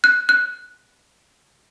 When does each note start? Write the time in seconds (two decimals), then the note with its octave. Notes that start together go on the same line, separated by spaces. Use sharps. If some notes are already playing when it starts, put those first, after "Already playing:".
0.04 F#6
0.29 F#6